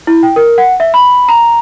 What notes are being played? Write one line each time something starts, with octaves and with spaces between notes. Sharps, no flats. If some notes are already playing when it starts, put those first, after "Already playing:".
E4
G5
A#4
F#5
E5
B5
A#5